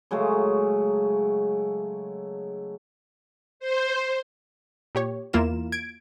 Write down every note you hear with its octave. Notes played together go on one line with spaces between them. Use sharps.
C#3 F#3 G#3 A3
C5
A#2 G4 C#5
E2 A#3 E4 F4 A#4 E7
G#6 D7